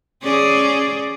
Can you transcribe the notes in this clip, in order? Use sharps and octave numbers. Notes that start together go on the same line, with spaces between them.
C#4 G#4 D5